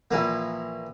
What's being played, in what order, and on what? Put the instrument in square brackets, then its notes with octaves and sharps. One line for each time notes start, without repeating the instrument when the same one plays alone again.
[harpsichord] A#1 E3 A#3